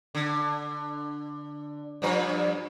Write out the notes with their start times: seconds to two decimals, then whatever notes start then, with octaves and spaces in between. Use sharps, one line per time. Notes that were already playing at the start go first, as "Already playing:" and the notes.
0.15 D3
2.02 G2 F3 B4